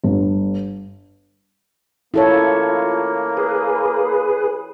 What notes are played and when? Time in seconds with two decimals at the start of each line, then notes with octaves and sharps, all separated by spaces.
0.04 G1
2.14 A#3 E4 F4 A4 C#5
3.37 G#4 B4